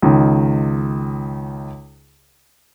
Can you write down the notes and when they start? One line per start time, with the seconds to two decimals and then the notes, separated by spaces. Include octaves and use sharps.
0.02 C#2 D#3